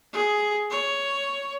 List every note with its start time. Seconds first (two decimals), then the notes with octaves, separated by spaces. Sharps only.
0.13 G#4
0.70 C#5